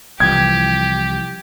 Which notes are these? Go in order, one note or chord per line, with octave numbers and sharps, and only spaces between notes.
C2 E3 F3 G4 G#6